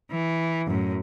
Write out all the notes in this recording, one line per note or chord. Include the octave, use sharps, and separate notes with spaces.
E3
F#2 A2